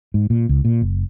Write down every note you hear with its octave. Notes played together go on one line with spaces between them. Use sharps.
G#2
A#2
C#2
A#2
F#1